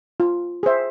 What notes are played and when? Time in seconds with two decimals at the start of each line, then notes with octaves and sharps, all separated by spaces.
0.20 F4
0.63 G#4 C5 E5